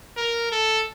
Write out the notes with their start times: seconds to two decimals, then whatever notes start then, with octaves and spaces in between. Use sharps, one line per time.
0.17 A#4
0.52 A4